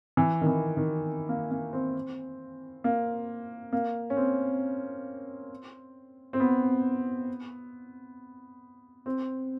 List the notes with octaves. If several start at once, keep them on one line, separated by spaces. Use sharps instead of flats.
E3
D#3
E3
D#3
A#3
A#3
C4
A#3
A#3
C#4
C4
C4
B3
C4